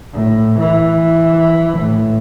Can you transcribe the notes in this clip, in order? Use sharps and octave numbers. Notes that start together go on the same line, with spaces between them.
A2
E3
A2